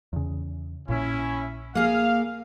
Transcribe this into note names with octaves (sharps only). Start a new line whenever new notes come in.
E2 C#3
A#1 A#2 C#4 E4
A#3 G#4 F5